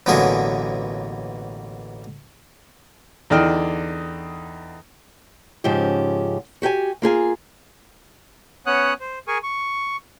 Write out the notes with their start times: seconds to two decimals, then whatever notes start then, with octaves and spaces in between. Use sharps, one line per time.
0.06 A1 B2 D3 F#3 A#3 G#4
3.30 E2 D3 D4 D#4 G5 F6
5.64 G#2 C#3 F3 C#4 G4
6.62 F#4 G4 F#5 G#5
7.02 A#3 F4 G#4 G#5
8.66 B3 C#4 C#5 F#5 D#6 F#6
9.00 C5
9.28 G#4 A#4 G#5 C#6
9.43 C#6